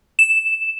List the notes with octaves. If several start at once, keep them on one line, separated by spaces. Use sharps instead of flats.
E7